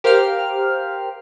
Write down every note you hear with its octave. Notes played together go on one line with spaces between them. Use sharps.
G4 A#4 C5 F5 G5 F6